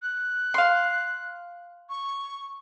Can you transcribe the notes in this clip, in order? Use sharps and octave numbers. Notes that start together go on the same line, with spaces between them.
F#6
F5 C6
C#6